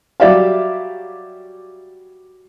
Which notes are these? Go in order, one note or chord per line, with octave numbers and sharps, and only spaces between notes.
F#3 G3 G4 D5 E5 F5